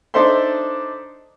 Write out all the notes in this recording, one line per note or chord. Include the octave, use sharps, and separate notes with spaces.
D4 D#4 A4 C5 E5 C6